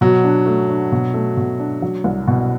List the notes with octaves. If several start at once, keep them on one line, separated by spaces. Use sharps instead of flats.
B2 F#3
D4
A3
D4
B2
A3
B2
D4
F#3
C2
B2